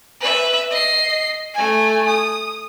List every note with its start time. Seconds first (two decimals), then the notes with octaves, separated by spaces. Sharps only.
0.21 B4 E5
0.70 D#5 C7
1.54 A3 G#5
2.08 D#6